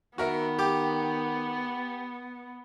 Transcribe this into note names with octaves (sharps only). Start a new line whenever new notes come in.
D#3 B3 F#4 A#4 E5
G4 D6